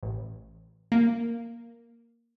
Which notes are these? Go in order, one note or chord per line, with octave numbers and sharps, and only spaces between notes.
A1
A#3